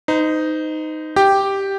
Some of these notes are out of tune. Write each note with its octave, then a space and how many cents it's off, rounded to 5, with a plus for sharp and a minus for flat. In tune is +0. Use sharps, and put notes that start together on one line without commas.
D#4 +0 C5 -40
G4 +0 G5 +0